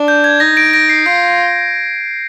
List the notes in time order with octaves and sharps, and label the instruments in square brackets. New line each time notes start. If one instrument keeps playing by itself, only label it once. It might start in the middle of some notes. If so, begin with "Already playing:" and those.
Already playing: [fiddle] D4
[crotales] G6
G#6
[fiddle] D#4 [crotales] A#6
[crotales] A#6 D7
A#6 D7
C7
[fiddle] F4 [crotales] C7